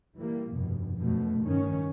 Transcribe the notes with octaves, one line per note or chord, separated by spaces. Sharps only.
E3 G3 A#3
F1 G2 B2
F1 F#2 B2 A3
G2 D#3 C#4